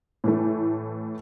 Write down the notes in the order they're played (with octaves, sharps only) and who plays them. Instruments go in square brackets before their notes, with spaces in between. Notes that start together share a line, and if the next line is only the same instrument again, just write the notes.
[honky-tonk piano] A2 E3 A3